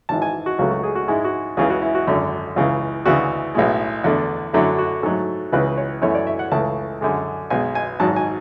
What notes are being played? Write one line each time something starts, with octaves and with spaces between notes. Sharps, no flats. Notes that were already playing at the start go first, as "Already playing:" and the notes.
G#1 G#2 E3 A5
G#5
F#4
C#2 C#3 F#3 A3 F#4
F#4
G#4
F#4
G#2 G#3 E4
F#4
C#2 C#3 E3 G#4
F#4
E4
F#4
G#1 F#2 D3
C#2 C#3 E3
D2 C#3 E3 F#4
B1 A2 G#3
E2 D3 A3
F#2 D3 F#3 A3 E4
F#4
G#2 F#3 A3 A4
C#2 C#3 E3 B4
C#5
F#2 E3 A3 C#5
D5
E5
F#5
C#2 C#3 E3 A3 A5
F#2 D3 G#3
B1 B2 G#3 G#5
G#5
G#1 G#2 F#3 A5
G#5